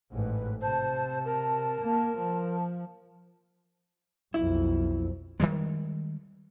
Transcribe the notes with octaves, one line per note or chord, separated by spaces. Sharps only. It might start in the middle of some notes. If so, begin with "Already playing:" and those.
A1 G#2 B4
C3 C5 A5
A#4
A#3
F3
B1 F2 E4
D#3 E3 G3 G#3